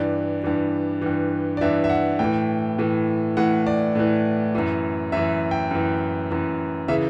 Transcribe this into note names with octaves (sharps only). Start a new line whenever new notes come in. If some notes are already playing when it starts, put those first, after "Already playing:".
Already playing: G2 E3 D5
G2 E3
G2 E3
D5
G2 E3 E5
E5
F#5
A2 E3 G5
A2 E3
A2 E3 F#5
D5
A2 E3
F#2 E3
F#2 E3 E5
G5
F#2 E3
F#2 E3
C#3 E3 E5